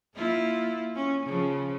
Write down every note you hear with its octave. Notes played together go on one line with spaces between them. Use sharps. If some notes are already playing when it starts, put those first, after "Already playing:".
A#3 E4 F4
C#4
C#3 F3